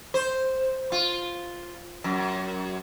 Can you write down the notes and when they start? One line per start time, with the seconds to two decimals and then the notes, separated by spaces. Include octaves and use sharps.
0.14 C5
0.92 F4
2.04 F#2